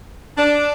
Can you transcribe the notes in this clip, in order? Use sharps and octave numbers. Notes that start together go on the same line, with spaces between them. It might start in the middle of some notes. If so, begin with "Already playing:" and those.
D4